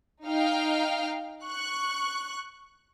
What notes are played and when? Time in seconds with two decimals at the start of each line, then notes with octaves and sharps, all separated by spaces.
0.25 D#4 F5 G5 F6
1.45 C#6 F#6